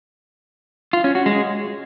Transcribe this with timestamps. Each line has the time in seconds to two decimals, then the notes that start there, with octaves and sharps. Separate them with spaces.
0.93 F4
1.04 C#4
1.15 F#4
1.26 G#3